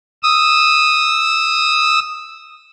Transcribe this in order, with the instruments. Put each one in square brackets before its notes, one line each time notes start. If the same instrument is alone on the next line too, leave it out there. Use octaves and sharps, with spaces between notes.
[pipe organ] D#6 E6